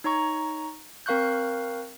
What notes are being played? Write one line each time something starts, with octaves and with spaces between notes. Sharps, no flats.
D#4 C#5 A#5 C#6
C4 A#4 F5 C#6 F#6 G6